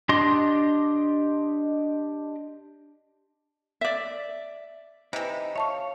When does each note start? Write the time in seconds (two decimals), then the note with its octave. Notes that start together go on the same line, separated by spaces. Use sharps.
0.09 D4 G4 D#5 C6
3.81 D5 E5
5.13 C3 E3 D#4 E5
5.56 C#5 E5 F5 A5 C#6